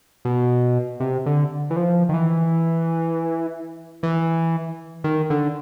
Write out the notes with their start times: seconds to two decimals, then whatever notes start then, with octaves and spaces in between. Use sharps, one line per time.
0.25 B2
1.00 C3
1.26 D3
1.70 E3
1.76 F3
2.09 D#3
2.14 E3
4.03 E3
5.04 D#3
5.30 D3